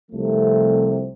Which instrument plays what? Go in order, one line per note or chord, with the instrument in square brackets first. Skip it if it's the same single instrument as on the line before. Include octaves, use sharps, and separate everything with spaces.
[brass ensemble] C2 C3 F3 A3